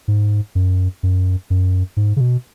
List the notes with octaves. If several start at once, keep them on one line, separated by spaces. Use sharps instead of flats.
G#2
F#2
F#2
F#2
G#2
C#3
B2